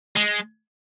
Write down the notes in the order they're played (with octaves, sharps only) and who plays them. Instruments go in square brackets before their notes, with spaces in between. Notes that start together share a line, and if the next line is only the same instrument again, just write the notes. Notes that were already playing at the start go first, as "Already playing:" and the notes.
[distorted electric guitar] G#3